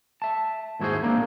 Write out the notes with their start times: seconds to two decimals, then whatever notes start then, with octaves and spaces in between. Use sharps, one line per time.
0.22 E5 A5
0.80 D#2 G#2 E4 F#4 G#4 C5
1.03 A#3 C4 D4